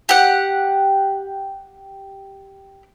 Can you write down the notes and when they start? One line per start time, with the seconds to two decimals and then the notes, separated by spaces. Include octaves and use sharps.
0.09 G4 F#5